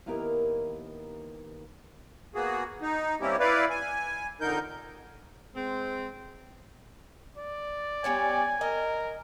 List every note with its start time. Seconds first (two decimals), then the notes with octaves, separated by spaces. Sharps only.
0.06 D#2 A#3 B3 E4 G4 A#4
2.35 A#3 B3 F#4 G#4
2.82 D#4
3.21 G3 A#3 C4 C#4 E4 G4
3.40 E4 B4 D5 F5
3.70 G#5
4.41 F2 D3 D#4 A#4 G6
5.54 G#3 C4
7.37 D5
8.04 G3 B3 C#4 G#5
8.61 A#4 D#5